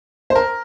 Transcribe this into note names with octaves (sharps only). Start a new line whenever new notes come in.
C5
A#4